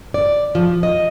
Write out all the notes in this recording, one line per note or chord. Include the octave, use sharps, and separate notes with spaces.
D5
F3
D#5